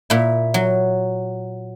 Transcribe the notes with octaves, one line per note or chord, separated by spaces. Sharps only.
A#2 E4
F#3